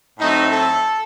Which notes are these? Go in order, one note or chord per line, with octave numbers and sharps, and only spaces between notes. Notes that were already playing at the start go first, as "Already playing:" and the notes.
A2 F#3 A3 C4 D#4
A4